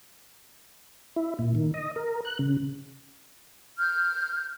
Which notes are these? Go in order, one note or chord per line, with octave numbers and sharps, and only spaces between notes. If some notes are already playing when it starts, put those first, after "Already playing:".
E4
A#2
D#3
D#5
A#4
F#6
C#3
F6 G6